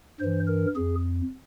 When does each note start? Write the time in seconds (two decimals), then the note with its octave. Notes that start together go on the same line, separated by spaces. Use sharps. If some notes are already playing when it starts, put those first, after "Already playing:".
0.20 G2 E3 C5
0.47 A#4
0.76 F2 G#4